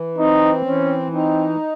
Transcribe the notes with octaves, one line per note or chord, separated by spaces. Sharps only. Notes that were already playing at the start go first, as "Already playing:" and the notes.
Already playing: E3
C4 D#4
E3 C#4
C4 D#4